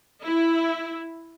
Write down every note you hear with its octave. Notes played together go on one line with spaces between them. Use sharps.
E4